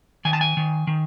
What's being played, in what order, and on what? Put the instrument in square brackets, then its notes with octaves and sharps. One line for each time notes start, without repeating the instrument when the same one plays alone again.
[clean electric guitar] D#3 G#5
A5
G#5
D#3
D#3